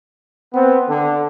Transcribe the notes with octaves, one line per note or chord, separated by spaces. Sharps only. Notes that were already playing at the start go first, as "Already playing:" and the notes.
B3 C4
D3